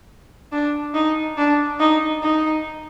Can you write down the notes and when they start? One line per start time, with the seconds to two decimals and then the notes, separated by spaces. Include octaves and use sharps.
0.52 D4
0.94 D#4
1.37 D4
1.80 D#4
2.22 D#4